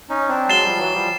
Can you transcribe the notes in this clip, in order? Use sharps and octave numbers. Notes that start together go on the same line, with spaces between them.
C#4 D#4
C4 D4
F#3 G#3 A6 C7 E7 G7
F3 G3
E3 F#3
F3 G3